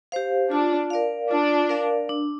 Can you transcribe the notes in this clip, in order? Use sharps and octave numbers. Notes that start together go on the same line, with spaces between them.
G4 C5 F5
D4 F4
A#4 D5 F5
D4 F4
A#4 D5 F5
D4